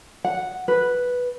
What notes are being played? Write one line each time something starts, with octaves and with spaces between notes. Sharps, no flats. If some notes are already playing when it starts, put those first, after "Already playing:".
F#5
B4